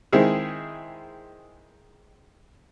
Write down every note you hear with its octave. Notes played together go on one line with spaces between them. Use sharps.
D#3 G#3 C4 E4 G#4